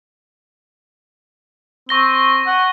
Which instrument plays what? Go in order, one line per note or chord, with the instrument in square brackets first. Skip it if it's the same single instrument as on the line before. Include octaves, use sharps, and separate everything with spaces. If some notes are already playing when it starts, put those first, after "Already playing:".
[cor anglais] C4 [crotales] C#6 A#6 G7
[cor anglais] F#5